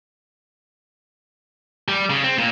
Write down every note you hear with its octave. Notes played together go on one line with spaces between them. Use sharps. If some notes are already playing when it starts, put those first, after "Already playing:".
G3
C#3
C4
A#2